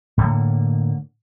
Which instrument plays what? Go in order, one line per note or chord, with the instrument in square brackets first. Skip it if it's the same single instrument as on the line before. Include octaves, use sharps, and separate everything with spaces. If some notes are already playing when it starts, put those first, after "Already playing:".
[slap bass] A2 D3 A#3